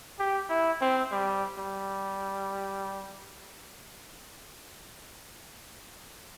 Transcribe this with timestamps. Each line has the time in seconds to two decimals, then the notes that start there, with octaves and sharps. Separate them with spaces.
0.19 G4
0.50 E4
0.81 C4
1.12 G3
1.58 G3